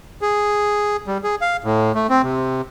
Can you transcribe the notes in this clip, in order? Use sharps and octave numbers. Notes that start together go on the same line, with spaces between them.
G#4
G3
G#4
F5
A2
A3
C4
C3